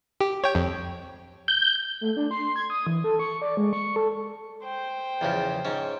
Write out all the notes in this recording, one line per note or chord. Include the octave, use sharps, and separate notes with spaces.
G4
C#5 G5
F2
G6
A3
D4
C6
G#6
D#6
E3
A4
C#6
D5
G#3
C#6
A4
C5 G5
E2 C#3 F3
G#2 C#4